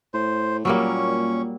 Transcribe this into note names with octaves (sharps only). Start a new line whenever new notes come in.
A2 C5
A#2 F#3 G3 A#3 C#4 C#6